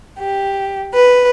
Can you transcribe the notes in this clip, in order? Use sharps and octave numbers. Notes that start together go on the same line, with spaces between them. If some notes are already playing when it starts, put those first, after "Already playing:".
G4
B4